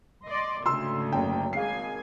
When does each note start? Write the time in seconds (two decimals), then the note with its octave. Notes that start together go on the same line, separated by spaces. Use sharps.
0.25 D5 D#5 C6
0.66 D2 G#2 C#3 C6 E6
1.12 F#1 G5
1.53 G#1 G#4 F5 G#5 C7